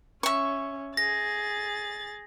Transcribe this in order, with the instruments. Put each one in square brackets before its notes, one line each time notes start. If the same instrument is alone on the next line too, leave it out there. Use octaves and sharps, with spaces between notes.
[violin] C#4 [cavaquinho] E5 C#6
[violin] G#4 A6 [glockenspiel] A#6